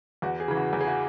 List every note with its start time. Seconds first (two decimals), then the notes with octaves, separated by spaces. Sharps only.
0.22 E2 F#4
0.40 G#4
0.48 C#3 E3
0.57 F#4
0.73 E2
0.81 G#4
0.88 F#4